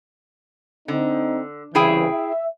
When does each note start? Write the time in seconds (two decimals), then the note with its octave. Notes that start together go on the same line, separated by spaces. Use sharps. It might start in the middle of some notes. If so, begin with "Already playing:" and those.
0.88 D3 C4 D#4
1.75 C2 C#3 E3 E4 G#4 G5
2.12 E5